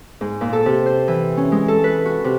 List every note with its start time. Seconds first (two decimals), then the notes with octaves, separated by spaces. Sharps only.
0.21 G#2
0.41 A#2
0.53 A4
0.66 C3
0.86 C5
1.08 E3
1.37 C#4
1.52 G#3
1.68 A4
1.84 B4
2.05 F#4
2.24 C3